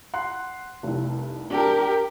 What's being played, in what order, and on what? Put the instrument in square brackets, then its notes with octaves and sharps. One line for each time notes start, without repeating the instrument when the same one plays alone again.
[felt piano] F#5 C6 F#6
F1 C2
[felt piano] D4 [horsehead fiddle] G4 A#4